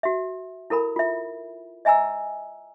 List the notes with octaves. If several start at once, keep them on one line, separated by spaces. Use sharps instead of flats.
F#4 E5
E4 A4 A#4 B5
F4 E5
D#5 E5 G#5 A#5 E6